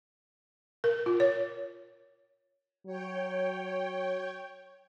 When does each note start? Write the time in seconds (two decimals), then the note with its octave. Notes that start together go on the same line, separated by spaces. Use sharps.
0.84 A#4
1.06 F4
1.20 C#5
2.86 F#3 C#5 G5